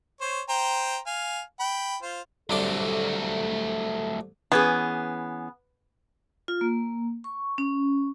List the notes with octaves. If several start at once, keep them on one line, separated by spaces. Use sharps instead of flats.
C5 C#5
C5 G5 A#5
F5 G#5
G5 B5
F4 C5
C2 F#3 A3 D4 A4 D6
E3 B3 C#4 G#4
F4
A#3
C#6
C#4